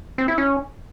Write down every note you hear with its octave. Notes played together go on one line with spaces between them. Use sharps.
C4
E4
C#4